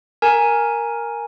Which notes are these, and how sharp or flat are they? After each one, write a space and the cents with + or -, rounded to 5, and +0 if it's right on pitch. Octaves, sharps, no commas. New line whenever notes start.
A#4 +0 G#5 +0